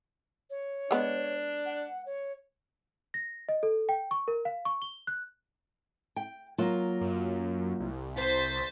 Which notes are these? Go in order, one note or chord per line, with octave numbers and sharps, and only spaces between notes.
C#5
G#3 B3 D4
F#5
C#5
A#6
D#5
A4
G5
C#6
A#4
F5
C#6
G7
F#6
G5
F#3 A#3 F4
F#2
C2
C3 C5 A6 B6